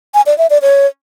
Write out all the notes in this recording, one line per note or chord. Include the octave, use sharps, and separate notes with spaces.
G#5
D5
E5
D5
C#5